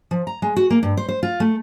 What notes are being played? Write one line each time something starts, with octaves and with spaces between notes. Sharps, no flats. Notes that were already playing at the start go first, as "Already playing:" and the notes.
F3
A#5
G#3
F#4
A#3
G2
C5
C5
F4
A3